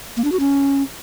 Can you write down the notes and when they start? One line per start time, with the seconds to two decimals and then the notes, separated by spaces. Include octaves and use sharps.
0.17 A#3
0.24 D4
0.32 F#4
0.40 C#4